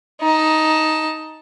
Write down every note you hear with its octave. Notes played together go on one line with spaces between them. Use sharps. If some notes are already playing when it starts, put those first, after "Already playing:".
D#4 A5